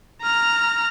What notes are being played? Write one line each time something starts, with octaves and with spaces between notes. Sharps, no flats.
A#5 F6